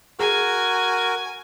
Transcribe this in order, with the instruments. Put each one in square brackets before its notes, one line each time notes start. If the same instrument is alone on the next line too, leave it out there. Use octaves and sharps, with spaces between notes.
[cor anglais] F#4 [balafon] G#4 [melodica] A#4 [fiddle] G#5